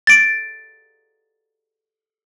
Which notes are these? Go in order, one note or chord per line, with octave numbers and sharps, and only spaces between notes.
A6 D7